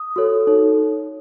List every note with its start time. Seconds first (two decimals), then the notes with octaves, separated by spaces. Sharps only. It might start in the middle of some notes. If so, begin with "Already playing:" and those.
Already playing: D#6
0.16 F#4 A4 C#5
0.47 D#4 A4 C#5